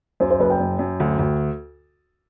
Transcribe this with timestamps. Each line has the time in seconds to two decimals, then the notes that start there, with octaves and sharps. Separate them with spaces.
0.20 F#2 C5
0.31 C5
0.40 F#1 B4
0.50 G5
0.60 F#2
0.79 F#2
1.00 D2
1.19 D2